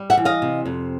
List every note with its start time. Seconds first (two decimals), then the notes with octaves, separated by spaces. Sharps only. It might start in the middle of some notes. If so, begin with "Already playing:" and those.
Already playing: G3
0.10 E5 F#5
0.17 E3
0.25 D#5 F5
0.42 C3
0.66 F2